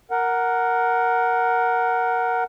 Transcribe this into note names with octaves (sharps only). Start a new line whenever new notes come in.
A#4 F#5